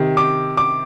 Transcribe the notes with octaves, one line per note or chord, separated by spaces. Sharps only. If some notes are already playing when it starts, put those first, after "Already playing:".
Already playing: C3 D#3
D6
D6